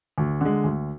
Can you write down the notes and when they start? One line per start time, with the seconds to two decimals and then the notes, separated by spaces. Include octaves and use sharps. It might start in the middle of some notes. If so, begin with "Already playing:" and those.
0.18 D2
0.41 D3 G#3
0.64 D2